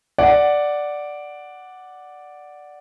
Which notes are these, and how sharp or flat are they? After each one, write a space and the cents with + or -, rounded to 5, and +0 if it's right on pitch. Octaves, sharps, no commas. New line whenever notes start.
D5 +0 F#5 +0